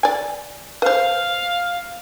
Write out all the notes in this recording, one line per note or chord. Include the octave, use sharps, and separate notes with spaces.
D5 G#5
B4 C5 F5